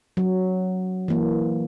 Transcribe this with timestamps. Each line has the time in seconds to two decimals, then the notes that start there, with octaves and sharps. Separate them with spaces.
0.17 F#3
1.08 E3 A#3